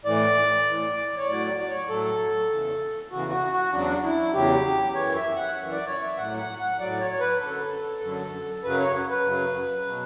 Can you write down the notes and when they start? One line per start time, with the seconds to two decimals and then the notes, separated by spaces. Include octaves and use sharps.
0.05 A2 E3 D5
0.66 A2 E3
1.17 C#5
1.27 A2 F#3 D5
1.47 D5
1.68 C#5
1.89 A2 F#3 A4
2.50 E2 C#3 E3
3.11 E2 C#3 E3 F#4
3.31 F#4
3.53 F#4
3.72 E2 C#3 F#3 D4
4.04 E4
4.33 E2 C#3 F#3 G4
4.95 F#2 E3 C#5
5.15 E5
5.36 F#5
5.56 F#2 E3 E5
5.71 D5
5.87 C#5
6.03 E5
6.17 A2 F#3 F#5
6.38 F#5
6.59 F#5
6.79 A2 F#3 D5
7.00 C#5
7.11 C#5
7.20 B4
7.40 F#2 D3 F#3 A4
8.01 F#2 D3 F#3
8.63 F#2 C#3 F#3 B4
8.78 C#5
9.10 B4
9.24 F#2 C#3 F#3
9.86 B2 F#3